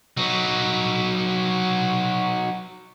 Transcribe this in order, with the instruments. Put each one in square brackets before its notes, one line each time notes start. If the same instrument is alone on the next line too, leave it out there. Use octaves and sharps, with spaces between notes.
[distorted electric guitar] F#3 D#4